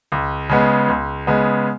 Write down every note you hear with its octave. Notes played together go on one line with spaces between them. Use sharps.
C#2
C#3 G#3 B3
C#2
C#3 G#3 B3